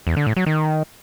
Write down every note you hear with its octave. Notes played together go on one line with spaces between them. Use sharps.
E2
D3
A2
F#3
D#3